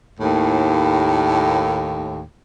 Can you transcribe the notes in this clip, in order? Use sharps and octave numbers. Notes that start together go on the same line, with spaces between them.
D#2 A2